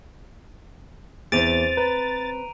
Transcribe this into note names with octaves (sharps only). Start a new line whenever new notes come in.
E2 C4 C5 A6 D7 D#7 F7
B4 A#5